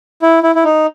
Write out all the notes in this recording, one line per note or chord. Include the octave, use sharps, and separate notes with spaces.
E4
E4
E4
D#4